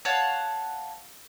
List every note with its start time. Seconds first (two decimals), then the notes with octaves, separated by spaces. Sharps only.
0.05 C#5 F5 F#5 A5